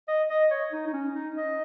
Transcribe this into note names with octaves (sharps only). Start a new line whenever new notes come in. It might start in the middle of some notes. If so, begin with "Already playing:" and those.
D#5
D#5
C#5
D#4
D#4
C#4
D#4
D#5